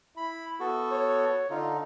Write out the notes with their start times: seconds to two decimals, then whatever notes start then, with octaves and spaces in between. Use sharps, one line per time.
0.17 E4 B5
0.60 B3 F#4 A4
0.91 C#5
1.50 D3 D#4 F4